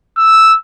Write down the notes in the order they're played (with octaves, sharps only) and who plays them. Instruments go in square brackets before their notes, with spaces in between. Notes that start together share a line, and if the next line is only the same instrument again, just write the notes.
[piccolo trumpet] E6